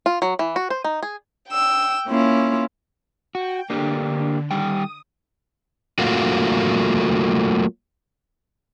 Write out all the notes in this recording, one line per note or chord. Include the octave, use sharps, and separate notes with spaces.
F4
F#3
E3
F#4
C5
D#4
G#4
G5 E6
A#3 C#4 E4 F4
F#4 G5
D3 A#3 D4 G4
D#3 G3 G5 D#6
F#3 A3 A#3 F4 F#4